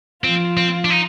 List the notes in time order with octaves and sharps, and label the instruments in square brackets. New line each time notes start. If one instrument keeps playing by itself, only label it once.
[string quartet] F3 F4 [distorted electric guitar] C4
[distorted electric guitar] C4
D4
D#4